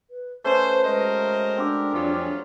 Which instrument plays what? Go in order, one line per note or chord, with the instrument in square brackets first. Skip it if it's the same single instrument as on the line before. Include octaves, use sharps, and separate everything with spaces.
[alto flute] B4
[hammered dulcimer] A3 C#4 [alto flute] B4 [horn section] C5
[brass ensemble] G#3 F#4 A#4 [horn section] C5 D#5
[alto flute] E5
[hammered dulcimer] C4 G4 [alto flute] D4
[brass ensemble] F2 G#4 [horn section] F#3 G3 F4